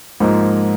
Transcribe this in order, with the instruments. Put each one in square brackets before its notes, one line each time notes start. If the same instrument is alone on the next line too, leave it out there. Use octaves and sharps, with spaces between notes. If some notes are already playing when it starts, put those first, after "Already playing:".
[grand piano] G#2 F3 A#3 D#4